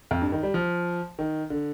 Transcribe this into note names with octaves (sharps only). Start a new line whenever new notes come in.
F2
G2
D#3
G3
F3
D#3
D3